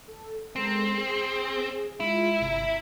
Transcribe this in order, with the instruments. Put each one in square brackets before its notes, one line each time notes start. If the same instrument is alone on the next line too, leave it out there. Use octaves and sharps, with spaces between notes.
[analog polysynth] A4
[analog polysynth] G#3 A4 A#4 [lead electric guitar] C4
[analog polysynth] G#4
[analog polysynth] G#3 F4 D#7 [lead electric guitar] E4
[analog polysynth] G1 C3 A#5